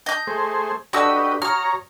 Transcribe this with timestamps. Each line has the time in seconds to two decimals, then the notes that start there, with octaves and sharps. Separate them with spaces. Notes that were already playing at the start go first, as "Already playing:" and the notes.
0.06 D#5 G6
0.27 A3 G#4 C5
0.93 D4 F#4 G4 A4 B4 D5 D#5 E6
1.42 F#4 C#5 A#5 D#6 F6